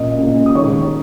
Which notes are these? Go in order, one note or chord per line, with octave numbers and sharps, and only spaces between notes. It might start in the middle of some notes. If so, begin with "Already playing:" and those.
Already playing: A#2 A#3 C#4 D#5
A#2 A#3 C#4
D#6
D#3 G#3 D#4 C#5 C#6